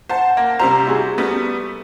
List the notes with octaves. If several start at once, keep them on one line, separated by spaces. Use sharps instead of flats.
C5 F#5 A5
A#3
C3 G3 C5 A#5
E4 F#4 G#4
G3 A3 B3